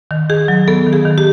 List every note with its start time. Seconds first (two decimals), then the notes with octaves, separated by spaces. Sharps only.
0.11 D#3
0.30 D#3 G#4
0.48 F#3
0.68 B3 A4
0.86 D#3
0.93 G#4
1.05 D#3
1.18 G4